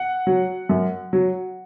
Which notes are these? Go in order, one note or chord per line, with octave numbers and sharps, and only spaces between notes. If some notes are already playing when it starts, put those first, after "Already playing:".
Already playing: F#5
F#3
F#2
F#3